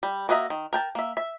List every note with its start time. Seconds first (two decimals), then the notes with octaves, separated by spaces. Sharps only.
0.03 G3
0.29 A#3 F#4 D#5 E5 A#5
0.50 D#3
0.73 A#4 G5 A5
0.95 A#3 E5
1.17 E5